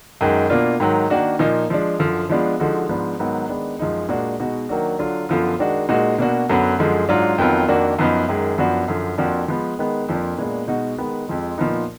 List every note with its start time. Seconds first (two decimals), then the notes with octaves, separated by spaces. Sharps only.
0.21 F#2 D#3 G#3
0.50 B2 A#3 D4 F4
0.80 G#2 D#3 F#3
1.10 D#3 A#3 D4 F#4
1.39 A#2 F3 A#3 D#4
1.70 F3 G#3 D4
1.99 F#2 D3 F3
2.30 F3 G#3 B3 D4 F4
2.60 D3 F3 G#3 D#4 F#4
2.89 G#2 F3 G#3 B3 D4
3.19 G#2 D#3 F#3 B3 D#4
3.49 D#3 G#3 B3 D4
3.79 F#2 F3 G#3 D#4
4.09 A#2 G#3 D4 F#4
4.40 B2 G#3 D#4 F#4
4.69 D#3 F#3 A#3 D4 F#4
4.99 D3 F#3 D4 F4
5.29 F#2 D3 F3 B3 F4
5.59 D#3 G#3 D4 F#4
5.89 A#2 G#3 D#4 F#4
6.18 B2 A#3 D4 F#4
6.49 F#2 D3 F#3 B3
6.79 F#2 D3 F3 G#3
7.09 G#2 F#3 D4 F4
7.38 F2 D#3 F#3 B3 F4
7.68 F2 D#3 A#3 D4 F#4
7.99 F#2 F3 B3 D#4
8.29 F#2 D#3 G#3
8.58 F#2 F3 B3 D4 F#4
8.88 F#2 D3 F3
9.18 F2 F3 A#3 D4 F#4
9.48 F3 G#3 B3
9.79 D#3 G#3 B3
10.09 F2 F3 A#3 D4
10.38 A#2 G#3 B3 D4
10.68 B2 G#3 D#4 F#4
10.98 D#3 G#3 B3
11.27 F2 F3 G#3
11.58 A#2 F3 B3 D#4